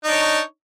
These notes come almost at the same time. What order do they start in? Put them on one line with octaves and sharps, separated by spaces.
D#4 D4 C#5